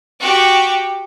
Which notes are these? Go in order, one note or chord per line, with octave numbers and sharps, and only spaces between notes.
F#4 G4